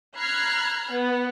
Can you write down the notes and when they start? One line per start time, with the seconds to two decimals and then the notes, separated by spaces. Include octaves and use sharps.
0.17 A#5 B5 F6 F#6 G#6 C7
0.93 B3